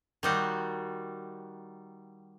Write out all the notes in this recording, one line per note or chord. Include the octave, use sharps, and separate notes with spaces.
D#3 G3 F#4